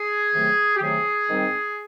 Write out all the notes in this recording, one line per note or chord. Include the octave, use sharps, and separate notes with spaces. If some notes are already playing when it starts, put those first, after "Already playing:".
Already playing: G#4
C3 D#3 F#3 A3
G4
C3 D#3 F#3 A3 G#4
G#2 D#3 G3 C4 D#4